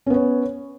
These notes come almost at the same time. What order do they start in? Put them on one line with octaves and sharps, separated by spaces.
C#4 B3 C#5